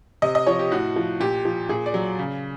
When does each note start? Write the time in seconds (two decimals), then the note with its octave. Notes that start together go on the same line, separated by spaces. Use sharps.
0.22 C3 D#5
0.35 D#5
0.47 F3 C#5
0.59 G4
0.71 A2 F#4
0.96 F3
1.20 A#2 G4
1.45 F3
1.69 A#2 G#4
1.86 D5
1.94 F#3
2.19 C#3